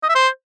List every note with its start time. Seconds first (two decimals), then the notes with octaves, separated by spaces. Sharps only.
0.03 D#5
0.09 E5
0.15 C5